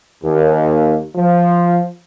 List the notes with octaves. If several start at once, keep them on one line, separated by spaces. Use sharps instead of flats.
D#2
F3